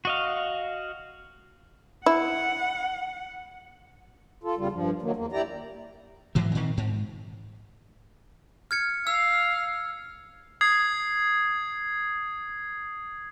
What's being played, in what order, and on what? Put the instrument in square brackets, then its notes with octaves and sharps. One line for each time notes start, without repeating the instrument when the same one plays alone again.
[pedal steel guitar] F#4 D#5 F5
[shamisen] E4 [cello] F#5
[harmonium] F4 A4
E2 C#3 G3 F4
G2 F3
D#3 F#3 A#3
E2 A#3
E4 G4 D5 A#5
[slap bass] G#2 E3 F#3
A#2 D#3 C4
G#2
[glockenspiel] F6 G#6 C#7
[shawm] F5 [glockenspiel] E6
[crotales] D#6 G#6 C7